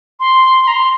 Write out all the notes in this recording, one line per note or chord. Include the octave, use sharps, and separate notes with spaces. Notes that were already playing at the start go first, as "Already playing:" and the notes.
C6
A#5
C6